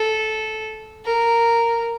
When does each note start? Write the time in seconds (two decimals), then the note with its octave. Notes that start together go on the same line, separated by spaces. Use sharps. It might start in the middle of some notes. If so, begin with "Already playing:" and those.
Already playing: A4
1.05 A#4